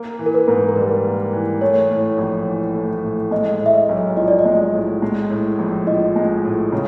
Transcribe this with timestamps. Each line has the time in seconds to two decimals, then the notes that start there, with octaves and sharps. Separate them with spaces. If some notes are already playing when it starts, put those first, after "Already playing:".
Already playing: A#3
0.19 E3
0.26 A#4
0.34 B4
0.48 G#2
0.68 A#4
0.76 G3 B4
1.05 A#3
1.33 E3
1.61 A3 C#5
1.90 A2
2.18 A#1
2.47 E3
2.74 A3
3.04 A2
3.31 G#3 D#5
3.60 A2
3.66 E5
3.74 D#5
3.89 B1
4.17 F3 D#5
4.28 D5
4.39 D#5
4.45 G#3
4.74 A2
5.02 G#3
5.30 A2
5.59 A#1
5.87 F3 D#5
6.16 G#3
6.45 A2
6.72 C#3